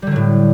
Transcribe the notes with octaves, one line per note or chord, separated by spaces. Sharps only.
A2 D3 F#3 G3